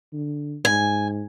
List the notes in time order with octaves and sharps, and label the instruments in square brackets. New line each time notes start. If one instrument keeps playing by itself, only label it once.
[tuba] D3
[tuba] G#2 [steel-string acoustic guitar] G#5